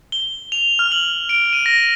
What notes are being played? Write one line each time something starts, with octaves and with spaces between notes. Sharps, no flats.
G7
F7
F6
F#7
D7
D#7
A#6